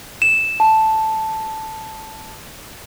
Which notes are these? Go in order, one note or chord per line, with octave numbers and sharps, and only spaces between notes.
E7
A5